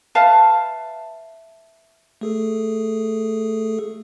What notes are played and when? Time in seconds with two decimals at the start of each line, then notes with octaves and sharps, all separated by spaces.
0.15 B4 E5 F5 A5
2.21 A3 G#4 A4